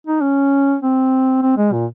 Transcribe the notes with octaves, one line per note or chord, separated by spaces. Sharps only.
D#4
C#4
C4
C4
G#3
A#2